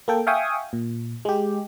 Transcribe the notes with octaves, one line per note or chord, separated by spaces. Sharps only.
A#3 A4 G5
E5 F5 G5 G#5 C#6 D#6
A#2
G#3 G4